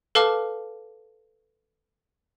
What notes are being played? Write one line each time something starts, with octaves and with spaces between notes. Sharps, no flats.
A4 B4 F5 A5 D6 F6